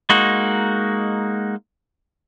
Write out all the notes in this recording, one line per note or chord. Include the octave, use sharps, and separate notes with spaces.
G#3 A#3 D#4 F#4